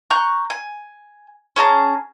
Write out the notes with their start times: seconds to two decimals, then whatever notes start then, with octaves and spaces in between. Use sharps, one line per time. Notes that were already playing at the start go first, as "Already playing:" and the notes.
0.10 A#5 C#6 F#6 G6
0.50 G#5
1.56 C#4 G#4 A5 A#5